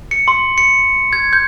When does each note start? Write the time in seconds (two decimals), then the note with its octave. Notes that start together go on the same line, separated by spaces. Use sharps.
0.11 C#7
0.28 C6
0.58 C#7
1.13 G#6
1.33 G6